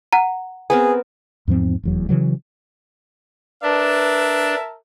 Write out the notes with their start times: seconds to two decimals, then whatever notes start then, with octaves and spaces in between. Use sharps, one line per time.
0.13 F#5 A#5
0.70 B3 C4 G#4 A#4
1.48 E2 G#2 F3 C4
1.83 F1 E2 F#3
2.09 C#3 E3 F#3
3.63 D4 A#4 B4 E5 A5